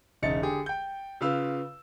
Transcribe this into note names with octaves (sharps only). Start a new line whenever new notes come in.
E1 C#3 D#4 E5 A6 C#7
D3 G4 G#4
G5 G6
C#3 F4 B4 F5 E6